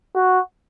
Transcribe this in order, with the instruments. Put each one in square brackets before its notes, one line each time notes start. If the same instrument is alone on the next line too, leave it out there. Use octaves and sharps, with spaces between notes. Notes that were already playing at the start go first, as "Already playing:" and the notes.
[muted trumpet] F#4